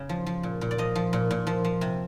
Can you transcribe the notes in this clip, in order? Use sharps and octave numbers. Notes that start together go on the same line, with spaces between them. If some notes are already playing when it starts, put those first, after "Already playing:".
Already playing: C#3
F3
F3
A#2
A#2
D5
F3 D#5
F3
A#2
A#2
F3
F3
C3